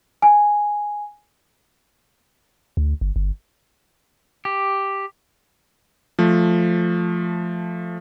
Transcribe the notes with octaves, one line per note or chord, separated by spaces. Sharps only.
G#5
D2
G1
G1
G4
F3 A3